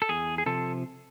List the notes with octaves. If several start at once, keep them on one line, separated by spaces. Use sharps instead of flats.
A4
E2 G#4
G#4
C3 F3 A4